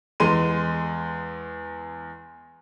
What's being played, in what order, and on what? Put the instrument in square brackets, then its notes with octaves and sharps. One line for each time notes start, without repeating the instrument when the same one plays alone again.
[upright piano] E2 G#3 C6 D#7